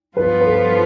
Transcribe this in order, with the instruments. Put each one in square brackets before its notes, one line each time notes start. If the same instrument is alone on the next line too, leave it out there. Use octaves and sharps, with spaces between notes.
[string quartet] G2 F3 B3 F4 [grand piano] B4
[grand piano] B4
A4